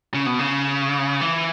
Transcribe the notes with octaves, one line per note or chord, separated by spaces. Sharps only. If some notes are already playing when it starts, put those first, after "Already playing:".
C#3
B2
C#3
E3